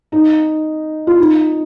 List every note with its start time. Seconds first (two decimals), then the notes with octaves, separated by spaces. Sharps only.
0.12 D#4
1.07 F4
1.18 D#4